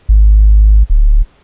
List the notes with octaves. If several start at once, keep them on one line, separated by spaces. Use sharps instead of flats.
G#1
D1